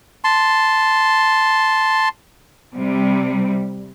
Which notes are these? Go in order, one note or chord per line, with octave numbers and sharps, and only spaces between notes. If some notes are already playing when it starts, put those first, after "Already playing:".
A5 C6
C3 G3